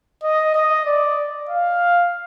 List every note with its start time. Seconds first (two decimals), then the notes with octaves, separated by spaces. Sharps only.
0.23 D#5
0.54 D#5
0.86 D5
1.49 F5